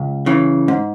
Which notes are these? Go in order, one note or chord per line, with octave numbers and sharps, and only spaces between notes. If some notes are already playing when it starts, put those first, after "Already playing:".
Already playing: C#2
C#3 E3
G#2